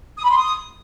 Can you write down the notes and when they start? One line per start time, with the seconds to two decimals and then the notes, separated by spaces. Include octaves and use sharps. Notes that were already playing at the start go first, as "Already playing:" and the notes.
0.17 D#6
0.24 B5
0.30 C6
0.37 D#6